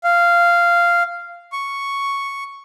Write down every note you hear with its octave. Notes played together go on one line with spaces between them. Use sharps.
F5
C#6